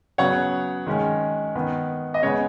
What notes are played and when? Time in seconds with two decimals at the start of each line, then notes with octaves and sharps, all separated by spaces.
0.18 C#3 F#3 B3 C#5 F#5
0.87 D#3 G#3 C#4
1.55 D#3 B3
2.14 D#5
2.22 C#3 G#3 B3 C#5